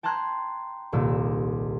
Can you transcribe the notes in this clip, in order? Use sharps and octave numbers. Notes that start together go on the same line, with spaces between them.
G5 A5 A#5 C6 F#6 G#6
D#1 C2 A#2 E6